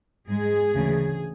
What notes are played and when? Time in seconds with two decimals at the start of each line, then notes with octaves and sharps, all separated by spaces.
0.28 G#2 G#3 G#4
0.74 D2 C#3 E3 A3